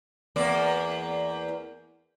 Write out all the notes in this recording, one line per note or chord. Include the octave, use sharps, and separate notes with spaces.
E2 A#3 D5